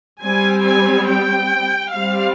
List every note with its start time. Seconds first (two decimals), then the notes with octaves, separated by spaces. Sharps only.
0.22 G3 C4 G#5
0.64 G#5
1.08 G5
1.92 G3 C4 F5